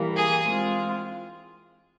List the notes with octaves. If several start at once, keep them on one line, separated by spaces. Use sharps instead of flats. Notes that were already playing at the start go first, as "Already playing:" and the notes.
Already playing: E3 G3 A#3
G#4
G#3 C4 F4